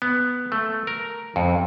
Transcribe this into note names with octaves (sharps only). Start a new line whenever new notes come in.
B3
A3
A#4
F2